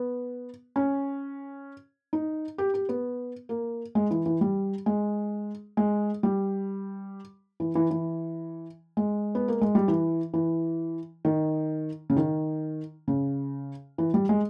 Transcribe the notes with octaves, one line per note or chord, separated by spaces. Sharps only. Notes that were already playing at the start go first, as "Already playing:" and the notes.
Already playing: B3
C#4
D#4
G4
G4
B3
A#3
G#3
E3
E3
G3
G#3
G#3
G3
E3
E3
E3
G#3
B3
A#3
G#3
G3
E3
E3
D#3
C#3
D#3
C#3
E3
G3
G#3